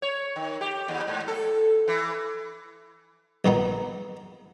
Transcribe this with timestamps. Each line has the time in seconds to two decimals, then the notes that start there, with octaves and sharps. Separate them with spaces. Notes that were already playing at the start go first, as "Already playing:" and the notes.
0.02 C#5
0.36 D#3
0.61 G4
0.88 D#2
1.07 G#2
1.28 A4
1.88 E3
3.45 A#1 D#3 B3 D#4